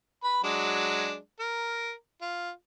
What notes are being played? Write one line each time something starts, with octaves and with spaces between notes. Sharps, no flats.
B4 B5
F#3 G#3 D4
A#4
F4